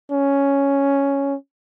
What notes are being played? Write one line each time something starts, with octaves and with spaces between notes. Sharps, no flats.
C#4